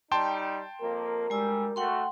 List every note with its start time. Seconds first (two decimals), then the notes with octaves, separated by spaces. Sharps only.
0.12 G3 D#4 G5 A5 C6
0.82 F2 A#3 A#4
1.30 D2 G3 G#3 G#5 E6
1.76 A3 F#4 F#5 G5 C6